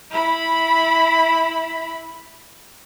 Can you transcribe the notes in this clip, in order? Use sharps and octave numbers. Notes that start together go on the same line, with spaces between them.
E4 B5